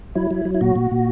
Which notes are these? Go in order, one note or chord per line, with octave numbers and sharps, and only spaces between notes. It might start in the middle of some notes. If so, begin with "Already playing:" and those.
F#3 E4
F#3
F#3
E4
A#2 F#4
A#2
A#2